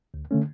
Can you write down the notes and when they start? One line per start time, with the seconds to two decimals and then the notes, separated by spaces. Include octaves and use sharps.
0.14 D2
0.31 D3 A3 C#4